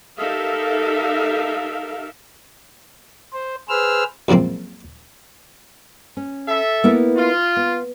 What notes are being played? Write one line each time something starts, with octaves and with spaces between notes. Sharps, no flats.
D#4 G4 A4 A#4 E5 F5
C5
G#4 B4 C5 E6 F6
C#2 F#2 F3 A#3 C4
C#4
A4 E5
A#3 B3 E4
F4
B3